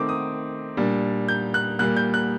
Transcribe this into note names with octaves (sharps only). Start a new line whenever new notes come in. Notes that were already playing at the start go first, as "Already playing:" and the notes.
Already playing: D#3 A3 C4 D6
D#6
A#2 G3 D4
G6
F#6
A#2 G3 A#3 F#6
G6
F#6